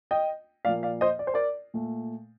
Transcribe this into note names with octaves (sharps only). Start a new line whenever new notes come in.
D#5 G5
A#2 F3 A#3 D5 F5
D5 F5
C5 D#5
D5
C5
A#4 D5
A#2 A3